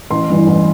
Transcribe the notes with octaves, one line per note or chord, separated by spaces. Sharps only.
A1 C6
G2 E3
A1